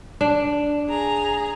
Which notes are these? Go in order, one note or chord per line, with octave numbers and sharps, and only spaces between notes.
D4
G#4 A#5